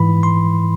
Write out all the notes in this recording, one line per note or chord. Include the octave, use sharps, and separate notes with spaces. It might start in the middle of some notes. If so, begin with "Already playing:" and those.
Already playing: G#2 E3 B5
C6